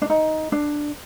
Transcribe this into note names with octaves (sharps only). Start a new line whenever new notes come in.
D4
D#4
D4